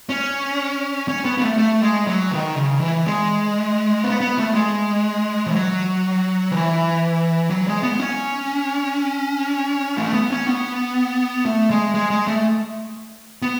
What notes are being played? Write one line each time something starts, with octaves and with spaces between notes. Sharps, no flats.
C#4
C#4
B3
B3
A3
A3
G#3
F#3
D#3
C#3
E3
G#3
B3
B3
A3
G#3
E3
F#3
E3
F#3
G#3
B3
C#4
A3
B3
C#4
B3
A3
G#3
G#3
G#3
A3
B3